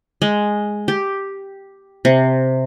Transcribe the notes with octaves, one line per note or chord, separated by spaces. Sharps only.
G#3
G4
C3